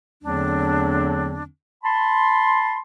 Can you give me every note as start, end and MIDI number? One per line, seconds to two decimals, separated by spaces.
0.23 1.44 40
0.23 1.44 50
0.23 1.44 54
0.23 1.44 57
0.23 1.44 60
0.23 1.44 62
1.84 2.78 81
1.84 2.78 83
1.84 2.78 84